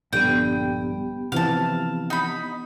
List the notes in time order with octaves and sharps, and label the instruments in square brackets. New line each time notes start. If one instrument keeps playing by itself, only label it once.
[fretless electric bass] A#1 G2 D3 [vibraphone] B3 G4 [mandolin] G5
[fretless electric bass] C3 E3 F3 [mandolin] F5 A5
[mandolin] D#4 B5